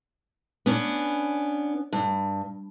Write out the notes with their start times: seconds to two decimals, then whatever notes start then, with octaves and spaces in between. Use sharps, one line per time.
0.66 B3 C#4 D4
1.93 G2